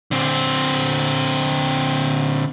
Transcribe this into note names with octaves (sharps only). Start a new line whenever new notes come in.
D3 C4